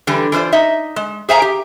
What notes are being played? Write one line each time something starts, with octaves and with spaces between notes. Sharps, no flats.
D3 E3 G3 B4
E3 F4 B4 C5 D5
D#4 D#5 E5
G#3
G#4 C5 E5 F5 G#5 A#5
G4